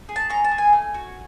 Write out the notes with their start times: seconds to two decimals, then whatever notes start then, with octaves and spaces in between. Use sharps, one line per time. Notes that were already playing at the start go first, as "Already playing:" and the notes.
0.09 G#4
0.16 A5
0.30 C#4 A#5
0.44 A5
0.51 G#4
0.58 G#5
0.73 A3
0.94 F#4